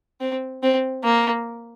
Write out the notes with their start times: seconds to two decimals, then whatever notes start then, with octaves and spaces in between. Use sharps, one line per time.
0.21 C4
0.63 C4
1.03 A#3